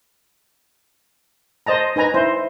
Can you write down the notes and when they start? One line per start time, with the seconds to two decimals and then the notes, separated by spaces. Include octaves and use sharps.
1.66 C5 D#5 A5 A#5
1.96 D#4 B4 G#5 A#5
2.14 E4 C5